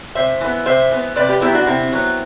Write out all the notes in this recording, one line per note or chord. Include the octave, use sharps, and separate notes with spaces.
C3 C5 E5
E3 B3
C3 C5 E5
E3 B3
C3 B4 D5
G4 B4
F#3 B3 E4 G4
D4 F#4
C3 C4 E4
F#3 B3